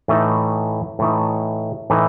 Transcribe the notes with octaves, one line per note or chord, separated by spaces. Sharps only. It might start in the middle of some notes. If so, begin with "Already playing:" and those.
A2 E3 A3 D#4
A2 E3 A3 D#4
A2 E3 A3 D#4